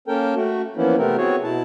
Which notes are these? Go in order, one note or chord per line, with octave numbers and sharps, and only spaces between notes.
A#3 C#4 A4 A#4 G5
A3 F#4
E3 F3 A#3 B3 C#4 E4
C3 A3 B3 C4 A#4
B3 C4 F#4 G#4 C#5
B2 E4 A5